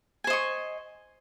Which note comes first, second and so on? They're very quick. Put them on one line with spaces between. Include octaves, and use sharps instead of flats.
G#5 C5 D#5 C#6